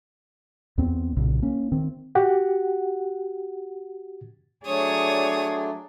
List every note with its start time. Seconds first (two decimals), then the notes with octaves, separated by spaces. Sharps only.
0.78 E2 B3 C4
1.17 B1 A#2 C#3
1.42 A#3 C#4
1.72 D#3 C4
2.15 F#4 G4 F#5
4.66 F#3 A3 D4 G#4 C#5 D5 D#6